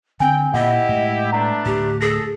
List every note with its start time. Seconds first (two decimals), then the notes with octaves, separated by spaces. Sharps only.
0.20 D3 C4 G5 G#5
0.54 A#2 E4 G4 D#5 F#5
0.89 A2 G#3
1.32 A3 B3 D4 A#5
1.66 D1 A2 G4
2.01 G#4 A4 A#6